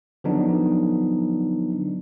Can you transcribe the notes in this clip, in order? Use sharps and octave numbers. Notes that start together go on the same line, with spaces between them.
D3 F3 F#3 B3 D4 D#4